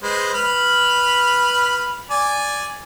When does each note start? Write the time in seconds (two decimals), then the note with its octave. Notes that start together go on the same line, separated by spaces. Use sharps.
0.03 G#3 B4 C5
0.34 B4 B5 F6
2.11 D5 G#5